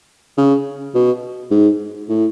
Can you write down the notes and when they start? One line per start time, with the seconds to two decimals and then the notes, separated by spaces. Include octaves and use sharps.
0.37 C#3
0.95 B2
1.51 G#2
2.09 A2